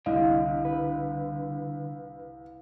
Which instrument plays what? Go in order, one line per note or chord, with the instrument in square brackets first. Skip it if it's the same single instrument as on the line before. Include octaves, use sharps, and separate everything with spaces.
[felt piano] C2 [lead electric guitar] D3 [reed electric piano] D#5 [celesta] F5
[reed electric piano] B4